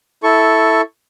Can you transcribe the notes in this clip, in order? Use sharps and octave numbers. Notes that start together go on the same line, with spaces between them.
E4 A4 C#6